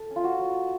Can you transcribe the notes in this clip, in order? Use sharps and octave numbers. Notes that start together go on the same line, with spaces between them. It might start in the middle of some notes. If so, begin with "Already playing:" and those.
Already playing: A4
C#4
F4
F#4
F#3